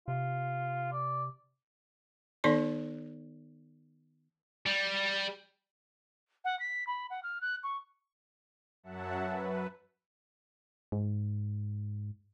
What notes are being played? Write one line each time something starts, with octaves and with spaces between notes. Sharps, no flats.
C3 F4
D5
D#3 B3 D#4 A4 D5 C6
G3
F#5
B6
B5
F#5
F6
F#6
C#6
F#2 F#3 E5 F#5 A5
B4
G#2